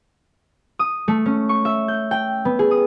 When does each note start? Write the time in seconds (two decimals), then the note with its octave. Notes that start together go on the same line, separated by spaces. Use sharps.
0.79 D#6
1.08 A3
1.26 C#4
1.49 C#6
1.65 E5
1.88 G6
2.11 G5
2.45 B3
2.59 G#4
2.71 D#6